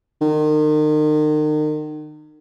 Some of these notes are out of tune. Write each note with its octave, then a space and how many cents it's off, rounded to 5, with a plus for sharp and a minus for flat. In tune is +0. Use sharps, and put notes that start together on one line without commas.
D#3 -35